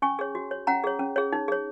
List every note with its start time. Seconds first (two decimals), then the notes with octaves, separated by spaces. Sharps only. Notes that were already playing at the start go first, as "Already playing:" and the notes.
0.02 C#4 G#5 C#6
0.19 G#4 C#5
0.35 F#4
0.51 C#5
0.67 C#4 F#5 A#5
0.84 G#4 C#5
0.99 C#4
1.16 G#4 C#5
1.33 D#4
1.48 G#4 C#5